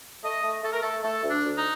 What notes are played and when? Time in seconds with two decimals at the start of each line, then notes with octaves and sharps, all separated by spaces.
0.23 A3 D#5
0.43 A3
0.63 A3 A4
0.73 A#4
0.82 A3 A4
1.03 A3 A4
1.24 D2
1.30 D4
1.44 D2
1.57 D#4